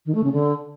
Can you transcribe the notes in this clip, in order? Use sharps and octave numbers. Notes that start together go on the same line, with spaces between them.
D#3
A3
C#3
D3